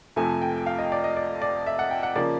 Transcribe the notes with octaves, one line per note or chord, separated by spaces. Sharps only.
F2 C3 F3 A3 G#5
G5
F5
D#5
D5
D#5
D5
D5
E5
F#5
G5
F#5
C#3 F3 A#3 D5